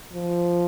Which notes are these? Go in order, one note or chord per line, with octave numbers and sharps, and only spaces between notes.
F3